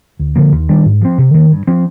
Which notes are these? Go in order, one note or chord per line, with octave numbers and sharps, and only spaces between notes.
D2
D3 F3 A#3
D#2
D#3 G3 D4
G#2
F3 C4
C3
D#3 A#3
G2
F3 C4